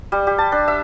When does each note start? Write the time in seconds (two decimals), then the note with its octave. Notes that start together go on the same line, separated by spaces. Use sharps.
0.12 G3
0.27 G4
0.38 A5
0.52 D4
0.68 E5